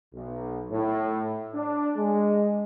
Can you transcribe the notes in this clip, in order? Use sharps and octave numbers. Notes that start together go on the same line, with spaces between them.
B1
A2
D4
G#3